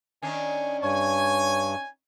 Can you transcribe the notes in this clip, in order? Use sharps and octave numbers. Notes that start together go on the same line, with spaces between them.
D#3 C#4 D4 G#5
G2 C#5 G#5